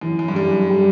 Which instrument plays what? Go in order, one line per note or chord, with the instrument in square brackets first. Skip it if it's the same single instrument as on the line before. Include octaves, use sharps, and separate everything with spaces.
[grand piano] F#2 [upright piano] E3
[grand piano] F#2
G2
[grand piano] F#2 [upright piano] G3
[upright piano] G3